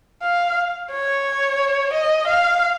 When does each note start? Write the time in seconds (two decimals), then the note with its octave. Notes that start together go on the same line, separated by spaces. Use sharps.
0.22 F5
0.91 C#5
1.93 D#5
2.27 F5